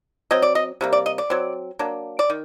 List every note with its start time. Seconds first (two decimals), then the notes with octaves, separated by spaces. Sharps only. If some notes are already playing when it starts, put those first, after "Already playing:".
0.31 F#3 C4 D#5
0.42 D5
0.55 D#5
0.81 C3 G3 A#3
0.93 D5
1.06 D#5
1.18 D5
1.30 F#3 C4
1.79 F#3 A#3 D4
2.19 D5
2.30 D#3